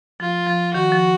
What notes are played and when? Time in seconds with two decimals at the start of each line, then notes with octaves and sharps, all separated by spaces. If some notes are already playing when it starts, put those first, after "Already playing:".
0.20 F3 F4
0.47 F3
0.74 D#3 F#4
0.92 F3